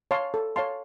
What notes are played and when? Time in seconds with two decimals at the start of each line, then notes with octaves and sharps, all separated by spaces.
0.11 C#5 F5 A5 C6
0.34 A4
0.56 C#5 F5 A5 C6